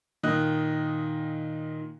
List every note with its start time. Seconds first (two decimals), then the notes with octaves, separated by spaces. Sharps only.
0.23 A#2 D#3 D#5 F#6